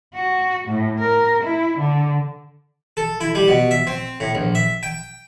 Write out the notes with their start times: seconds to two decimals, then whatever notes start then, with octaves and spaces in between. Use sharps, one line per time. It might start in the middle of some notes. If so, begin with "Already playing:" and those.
0.14 F#4
0.68 A2
0.99 A#4
1.43 E4
1.79 D3
2.97 A4
3.21 E4
3.35 G3
3.48 B2
3.71 E5
3.87 C4
4.20 A2
4.35 A#1
4.55 E5
4.83 G5